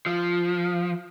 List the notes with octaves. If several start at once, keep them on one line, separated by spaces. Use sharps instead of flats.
F3